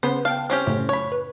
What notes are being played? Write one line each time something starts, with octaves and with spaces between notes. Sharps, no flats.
C#3 B3 B4 C5
F5 G5 A5
C4 C#4 G4
F#2 A2 C#3
C#5 B5
B4